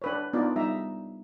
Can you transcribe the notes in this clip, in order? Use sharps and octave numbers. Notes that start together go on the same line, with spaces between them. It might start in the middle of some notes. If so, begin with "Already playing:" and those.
D4 B4 C#5
B3 D4 D#4 F4 D5
G3 D#4 E5 A#5